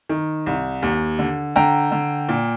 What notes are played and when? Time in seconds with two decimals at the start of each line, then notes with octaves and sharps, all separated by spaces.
0.09 D#3
0.46 C2
0.82 D#2
1.19 D3
1.56 D3 G5 A#5
1.92 D3
2.29 A#2